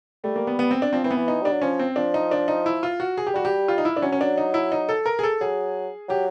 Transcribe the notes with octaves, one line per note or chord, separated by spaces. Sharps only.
G3 A3
A#3
B3
B3
C4
D4
F3 C4
E3 C4
B3
E3
D#4
G3 D4
F#3
F3 C#4
C4
F3 D4
D#4
D4
D#4
E4
F4
F#4
G#4
G4
G3 F#4
G4
F4
D#4
E4
D4
F#3 C#4
C#4
D4
D#4
E4
D#4
A4
A#4
G#4
A4
F#3 G#4
F#3 G4